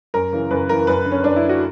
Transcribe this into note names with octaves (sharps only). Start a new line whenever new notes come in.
F#2 A#4
C#3 E3
F#2 B4
C#3 E3 A#4
F#2 B4
D3
C#4
F#2 D4
E4
D3
F#4